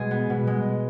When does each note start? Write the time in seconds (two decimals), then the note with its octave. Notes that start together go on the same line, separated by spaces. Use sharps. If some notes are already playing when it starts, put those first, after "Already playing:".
Already playing: B2 G#3 G#4
0.11 B3
0.30 B2
0.47 G#3